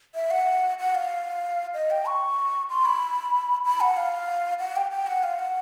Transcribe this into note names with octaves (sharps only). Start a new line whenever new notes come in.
E5
F#5
F#5
F5
D#5
G5
C#6
C6
B5
B5
F#5
F5
F#5
G5
G5
F#5
F5
F#5